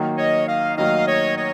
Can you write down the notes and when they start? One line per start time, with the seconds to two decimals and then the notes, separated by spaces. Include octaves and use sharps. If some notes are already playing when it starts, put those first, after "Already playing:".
Already playing: D#3 F#3 A#3 D#4
0.18 C#5 D#5
0.48 D#5 F5
0.78 D#3 F#3 A#3 D#4 D#5 F5
1.07 C#5 D#5
1.37 C#5 D#5